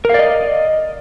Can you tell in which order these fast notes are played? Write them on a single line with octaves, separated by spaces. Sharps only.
A#4 F5 D5 D#5